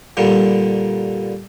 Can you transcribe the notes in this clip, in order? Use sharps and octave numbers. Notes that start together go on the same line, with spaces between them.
A#2 D3 G3